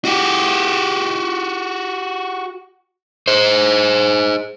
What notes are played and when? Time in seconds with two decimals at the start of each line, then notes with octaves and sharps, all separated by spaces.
0.05 F#4 G4
3.28 G#4 C5